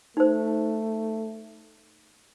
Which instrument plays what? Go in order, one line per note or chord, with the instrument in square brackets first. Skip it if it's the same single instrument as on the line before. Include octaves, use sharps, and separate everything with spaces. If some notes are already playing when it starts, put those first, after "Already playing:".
[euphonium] A3 [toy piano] D#4 C5